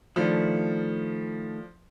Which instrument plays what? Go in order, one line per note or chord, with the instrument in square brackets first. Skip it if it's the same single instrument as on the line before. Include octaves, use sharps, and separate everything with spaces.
[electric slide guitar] D#3 A3 E4 [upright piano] F3 D4